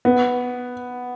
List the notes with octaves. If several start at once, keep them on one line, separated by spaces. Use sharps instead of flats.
B3